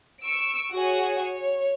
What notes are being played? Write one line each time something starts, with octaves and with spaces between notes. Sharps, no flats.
C#6 E6 D7
F#4 G#4 C#5 G#5
C#5